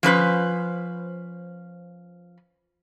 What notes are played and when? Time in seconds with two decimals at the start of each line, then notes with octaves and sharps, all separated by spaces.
0.03 F3 C#4 B4 C5